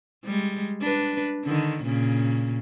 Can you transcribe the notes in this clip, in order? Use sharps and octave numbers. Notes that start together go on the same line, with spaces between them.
G3 G#3
D4 B4
D3 D#3
A#2 C#3